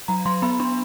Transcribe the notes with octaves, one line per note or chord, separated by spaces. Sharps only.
F#3 A#5
F#3 C6
B3 B5
D4 C6